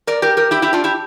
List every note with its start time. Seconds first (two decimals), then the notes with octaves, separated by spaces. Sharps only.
0.07 A#4 D5
0.22 G4 A#4
0.37 G4 A#4
0.51 E4 G4
0.62 E4 G4
0.73 D4 F4
0.84 E4 G4